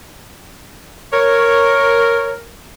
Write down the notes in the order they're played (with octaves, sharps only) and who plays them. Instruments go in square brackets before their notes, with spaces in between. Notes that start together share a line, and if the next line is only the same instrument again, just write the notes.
[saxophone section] A#4 [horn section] C#5